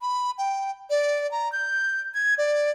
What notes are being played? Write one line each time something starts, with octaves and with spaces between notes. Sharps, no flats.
B5
G5
D5
A#5
G6
G#6
D5